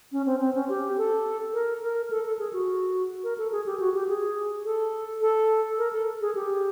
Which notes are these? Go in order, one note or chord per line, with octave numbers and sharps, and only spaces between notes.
C#4
C4
C4
C#4
G4
A4
A#4
A#4
A4
A4
G#4
F#4
A#4
A4
G#4
G4
F#4
G4
G#4
A4
A4
A#4
A4
G#4
G4